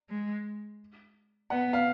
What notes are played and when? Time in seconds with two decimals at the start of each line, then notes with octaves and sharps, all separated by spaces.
0.10 G#3
1.50 B3 F#5
1.73 F5